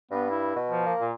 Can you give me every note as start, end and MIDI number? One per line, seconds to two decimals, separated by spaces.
0.11 0.53 43
0.11 0.30 59
0.30 0.56 64
0.56 0.82 47
0.71 0.93 53
0.86 1.06 58
1.00 1.13 46